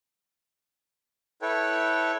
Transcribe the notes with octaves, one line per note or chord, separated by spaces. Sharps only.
E4 A4 B4 C#5 G5